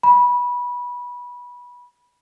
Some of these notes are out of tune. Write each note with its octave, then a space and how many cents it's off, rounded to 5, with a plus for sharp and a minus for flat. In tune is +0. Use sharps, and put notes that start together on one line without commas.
B5 -20